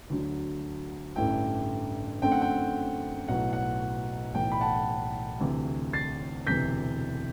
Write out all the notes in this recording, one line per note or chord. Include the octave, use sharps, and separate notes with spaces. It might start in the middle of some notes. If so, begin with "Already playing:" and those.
D2 D3 F#3
A1 G2 D3 A3 E4 G5
F#2 D3 A3 C4 G5
F#5
G5
B1 A2 F#3 B3 F#5
F#5
B1 A2 E3 G5
B5
F#5 A5
D2 C3 E3
A6 C7
E1 D2 C3 E3 G6 B6